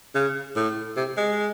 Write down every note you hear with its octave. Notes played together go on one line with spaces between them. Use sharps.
C#3
A2
C3
G#3